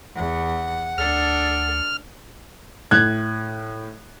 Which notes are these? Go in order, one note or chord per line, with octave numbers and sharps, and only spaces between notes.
E2 F#5
D2 D4 A4 F6
A2 F#6 G#6